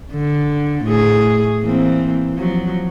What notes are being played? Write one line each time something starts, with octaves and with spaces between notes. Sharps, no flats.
D3
A2 G#4
E3 A#3 C4
F3 F#3